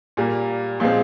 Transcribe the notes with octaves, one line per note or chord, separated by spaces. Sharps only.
A#2 G3 A#3
A#2 F3 G#3 C4